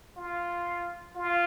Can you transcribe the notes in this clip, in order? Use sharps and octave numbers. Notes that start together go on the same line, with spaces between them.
F4
F4